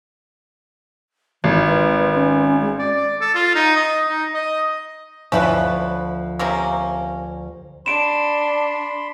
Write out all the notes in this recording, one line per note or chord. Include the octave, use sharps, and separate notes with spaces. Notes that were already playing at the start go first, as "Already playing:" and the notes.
G#1 E3
B4
C#4
G#3
D5
A4
F4
D#4
D#5
D#4
D#5
D2 F3 C#4 E4 B4 E5
C3 A#3 C#4
D4 B5 C6 D7 E7